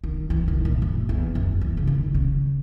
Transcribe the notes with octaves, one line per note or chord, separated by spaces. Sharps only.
D#3
E3
D#3
A#2
F#2
E2
F#2
E3
C#3
D#3
C#3